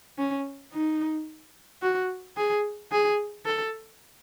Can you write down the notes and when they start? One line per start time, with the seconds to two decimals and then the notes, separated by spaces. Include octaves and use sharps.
0.18 C#4
0.72 D#4
1.82 F#4
2.37 G#4
2.92 G#4
3.45 A4